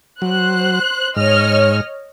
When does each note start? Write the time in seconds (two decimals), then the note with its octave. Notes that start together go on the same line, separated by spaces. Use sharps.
0.22 F#3 C5 F#6
1.16 G#2 C#5 D#5 F6